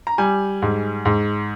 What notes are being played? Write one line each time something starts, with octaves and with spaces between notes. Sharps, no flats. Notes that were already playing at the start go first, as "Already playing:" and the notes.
A#5
G3 G#5
G#2
G#2